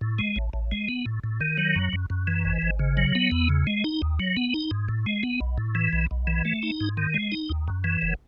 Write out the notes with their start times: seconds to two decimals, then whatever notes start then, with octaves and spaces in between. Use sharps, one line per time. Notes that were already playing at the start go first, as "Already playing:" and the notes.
0.01 A2
0.19 G#3
0.36 A1
0.53 A1
0.72 G#3
0.89 B3
1.06 A2
1.24 A2
1.41 D#3
1.58 F#3
1.75 F#2
1.93 F#2
2.10 F#2
2.27 E3
2.45 G#1
2.62 G#1
2.79 C#3
2.97 F#3
3.15 B3
3.31 E2
3.49 C#3
3.67 G#3
3.84 D#4
4.02 D#2
4.20 F#3
4.37 B3
4.54 D#4
4.71 G#2
4.89 A2
5.06 G#3
5.23 B3
5.41 B1
5.58 A2
5.75 E3
5.93 B1
6.11 B1
6.27 E3
6.45 A3
6.63 D#4
6.81 G#2
6.97 D#3
7.14 G#3
7.32 D#4
7.50 D#2
7.68 F#2
7.84 E3
8.02 F#1